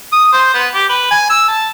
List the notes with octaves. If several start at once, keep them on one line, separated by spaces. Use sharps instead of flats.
D#6
C5
B3
G4
B4
G#5
E6
A5